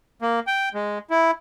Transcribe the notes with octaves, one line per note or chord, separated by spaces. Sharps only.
A#3
G5
G#3
E4